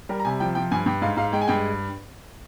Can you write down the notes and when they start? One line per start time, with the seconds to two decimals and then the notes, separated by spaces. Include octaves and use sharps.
0.09 G3 A#4
0.20 A#5
0.25 C3 G#5
0.40 F3 G5
0.55 F3 G5
0.71 G2 G#5
0.86 G2 G5
1.02 G#2 F5
1.17 G#2 F5
1.32 G#3 G5
1.41 G#5
1.48 G2 G5